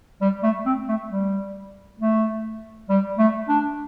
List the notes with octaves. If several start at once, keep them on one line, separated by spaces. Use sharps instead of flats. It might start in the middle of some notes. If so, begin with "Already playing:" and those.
G3
A3
C4
A3
G3
A3
G3
A3
D4